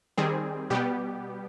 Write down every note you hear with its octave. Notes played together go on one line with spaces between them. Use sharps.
D#3 G3 C4 G#4
B2 G3 B3 G4